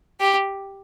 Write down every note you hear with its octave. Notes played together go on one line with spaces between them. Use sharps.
G4